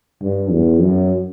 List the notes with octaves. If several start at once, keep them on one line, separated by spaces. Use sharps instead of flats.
G2
E2
F#2